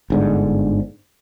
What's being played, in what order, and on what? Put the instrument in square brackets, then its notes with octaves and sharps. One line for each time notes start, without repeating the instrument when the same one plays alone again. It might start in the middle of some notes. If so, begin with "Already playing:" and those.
[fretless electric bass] G1 G#2 D3